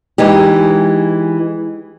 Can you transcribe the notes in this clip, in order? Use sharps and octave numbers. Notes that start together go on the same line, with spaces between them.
E3 G#3 D#4 G4